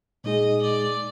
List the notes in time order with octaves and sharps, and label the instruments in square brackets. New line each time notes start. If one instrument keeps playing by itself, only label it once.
[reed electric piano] A#2 G#3 D#4 G#4 [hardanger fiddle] D#5
[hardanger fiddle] D5